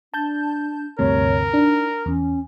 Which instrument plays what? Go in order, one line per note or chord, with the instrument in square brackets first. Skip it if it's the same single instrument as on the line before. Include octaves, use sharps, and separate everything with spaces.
[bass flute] D4 [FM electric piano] A5 G6
[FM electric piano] D2 G2 C3 [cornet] A#4 [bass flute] C#5
[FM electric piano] D4 [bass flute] D#4
[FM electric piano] E2 [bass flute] C#4